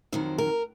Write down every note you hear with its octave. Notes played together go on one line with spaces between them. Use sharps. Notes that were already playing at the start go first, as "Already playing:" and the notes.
F2 D#3 F#3 C5
A#4